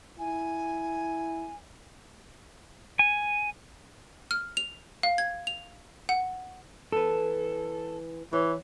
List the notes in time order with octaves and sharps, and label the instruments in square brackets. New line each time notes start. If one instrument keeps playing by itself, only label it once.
[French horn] E4 [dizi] G#5
[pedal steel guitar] G#5
[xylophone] F6
F7
F5
G#6
F7
F#5
[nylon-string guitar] E3 B3 B4 [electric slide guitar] A4
[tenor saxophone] E3 [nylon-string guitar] C#5